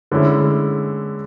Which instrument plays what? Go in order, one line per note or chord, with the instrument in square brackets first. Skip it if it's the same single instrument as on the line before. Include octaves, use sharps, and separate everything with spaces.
[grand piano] D3 G#3 C#4 E4